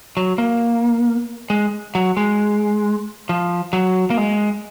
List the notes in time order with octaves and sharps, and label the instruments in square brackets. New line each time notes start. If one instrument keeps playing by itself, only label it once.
[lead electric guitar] F#3
A#3
G#3
F#3
G#3
F3
F#3
A#3
G#3